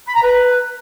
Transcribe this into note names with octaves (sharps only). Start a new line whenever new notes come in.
B5
A#5
B4